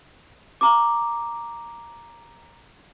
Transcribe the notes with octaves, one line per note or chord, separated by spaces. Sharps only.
A#5 D6